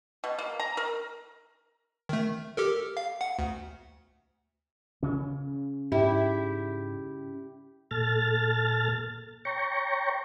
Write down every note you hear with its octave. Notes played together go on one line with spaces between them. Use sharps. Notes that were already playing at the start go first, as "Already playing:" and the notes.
B2
A#3
A#5
A#4
D#3 A3
G4 A4 A#4
F5
F#5
D2
C#3 C#4
G#2 E4 G4
A#2 A4 F6 A6
C#5 G5 A#5 C#6